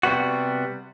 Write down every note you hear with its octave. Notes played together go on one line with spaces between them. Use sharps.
C3 G3 B3 F#4